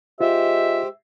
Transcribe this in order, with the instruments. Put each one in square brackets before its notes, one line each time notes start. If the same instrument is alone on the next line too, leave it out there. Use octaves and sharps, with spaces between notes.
[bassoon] G#3 [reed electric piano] F4 [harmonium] G4 C5 [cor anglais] E5